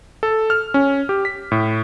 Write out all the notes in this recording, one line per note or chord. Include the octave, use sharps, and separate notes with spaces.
A4
F6
C#4
G4
B6
A2